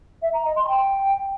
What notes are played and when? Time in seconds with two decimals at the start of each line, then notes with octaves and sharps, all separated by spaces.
0.22 E5
0.33 A#5
0.44 D#5
0.56 C6
0.67 G5